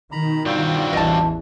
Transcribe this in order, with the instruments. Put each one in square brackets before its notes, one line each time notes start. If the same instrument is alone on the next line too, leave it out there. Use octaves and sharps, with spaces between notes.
[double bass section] B2 D#3 [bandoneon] A#5 B5
[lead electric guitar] G2 C4 [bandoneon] G3 F4 F#4
[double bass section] A1 E2 E3 [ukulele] D#5 A5